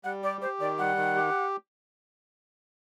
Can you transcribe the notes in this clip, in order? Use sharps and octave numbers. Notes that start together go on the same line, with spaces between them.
G3 F#5
G4 D5
G4 C5
D#3 D5
G3 F#5
D#3
G4